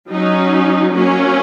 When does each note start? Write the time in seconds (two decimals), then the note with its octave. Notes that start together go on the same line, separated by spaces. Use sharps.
0.12 F#3 C#4 D#4
0.94 F#3 A#3 C#4